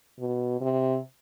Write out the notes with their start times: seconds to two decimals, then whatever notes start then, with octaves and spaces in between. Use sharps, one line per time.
0.20 B2
0.61 C3